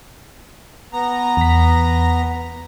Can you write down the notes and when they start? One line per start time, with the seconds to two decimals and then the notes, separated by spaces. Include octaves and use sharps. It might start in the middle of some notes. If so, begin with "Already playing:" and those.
0.93 B3 A#5
1.37 E2 B6